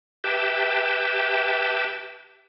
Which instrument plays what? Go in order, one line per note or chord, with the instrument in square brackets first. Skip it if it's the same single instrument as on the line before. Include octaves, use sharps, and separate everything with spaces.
[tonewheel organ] G4 B4 E5 G5 A5